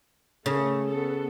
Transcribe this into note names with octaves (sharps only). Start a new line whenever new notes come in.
C#3 A3
B3 A4